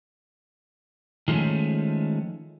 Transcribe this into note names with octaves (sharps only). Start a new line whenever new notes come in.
D#3 F3 G#3 A3 C#4